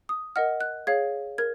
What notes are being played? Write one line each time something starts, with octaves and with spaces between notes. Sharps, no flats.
D#6
A#4 D#5 F#5 F6
F#6
G#4 C#5 F5 G#6
A#4 G#6